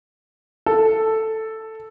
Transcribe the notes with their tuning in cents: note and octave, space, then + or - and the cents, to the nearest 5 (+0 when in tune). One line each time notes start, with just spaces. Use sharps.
A4 +5